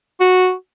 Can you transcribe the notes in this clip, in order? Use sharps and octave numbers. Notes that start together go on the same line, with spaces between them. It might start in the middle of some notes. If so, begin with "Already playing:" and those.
F#4